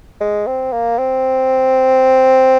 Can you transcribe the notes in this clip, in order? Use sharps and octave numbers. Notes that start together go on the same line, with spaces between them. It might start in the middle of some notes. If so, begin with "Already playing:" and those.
G#3
C4
A#3
C4